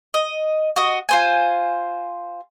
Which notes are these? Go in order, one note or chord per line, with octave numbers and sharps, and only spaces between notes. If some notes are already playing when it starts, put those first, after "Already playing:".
D#5
F#4 D#5
F4 C5 G#5